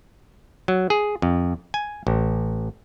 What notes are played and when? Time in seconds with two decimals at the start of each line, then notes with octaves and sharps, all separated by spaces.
0.68 F#3
0.90 G#4
1.22 F2
1.74 G#5
2.07 A1